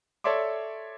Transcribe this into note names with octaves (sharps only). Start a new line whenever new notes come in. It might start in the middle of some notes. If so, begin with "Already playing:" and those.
A4 C#5 D5 E5 C6 D6